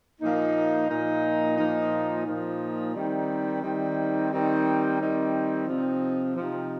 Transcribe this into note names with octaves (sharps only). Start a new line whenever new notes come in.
A#2 F3 A#3 D#4
A#2 F3 A#3 D#4
A#2 F3 A#3 D#4
A#2 F3 A#3 D#4
D#3 G3 C4 D#4
D#3 G3 C4 D#4
D#3 G3 C4 D#4
D#3 G3 C4 D#4
C3 F3 C4 D#4
C3 F3 C4 D#4